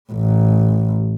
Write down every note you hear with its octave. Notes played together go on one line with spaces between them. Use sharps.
A1